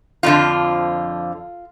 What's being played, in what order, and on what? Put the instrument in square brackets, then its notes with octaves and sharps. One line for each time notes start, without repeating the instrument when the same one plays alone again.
[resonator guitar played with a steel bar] F2 D3 F3 F4